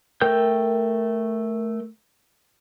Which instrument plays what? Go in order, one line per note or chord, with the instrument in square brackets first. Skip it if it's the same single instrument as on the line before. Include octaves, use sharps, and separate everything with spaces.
[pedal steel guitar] A3 A#4 G5 G6